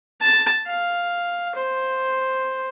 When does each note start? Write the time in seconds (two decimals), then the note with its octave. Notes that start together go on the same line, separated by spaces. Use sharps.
0.21 A5
0.67 F5
1.55 C5